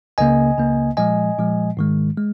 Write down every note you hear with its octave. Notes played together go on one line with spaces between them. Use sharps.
C#2 C#3 A#3 D#5 G#5
C#2 C#3 A#3
A#2 F3 G#3 D#5 G#5
A#2 F3 G#3
G#2 D#3 G#3
G#3